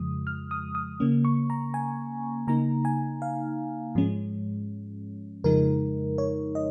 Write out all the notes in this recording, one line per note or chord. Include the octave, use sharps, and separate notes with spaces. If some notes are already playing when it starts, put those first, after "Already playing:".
Already playing: F2 C#3 F3 G#3 D#6
F6
D#6
D#6
C#3 A#3 C#4
C#6
A#5
G#5
C#3 A#3 D#4 A#5
G#5
F5
G#2 F3 G#3 C#4
F2 C#3 F3 G#3 D#4 A#4
C#5
D#5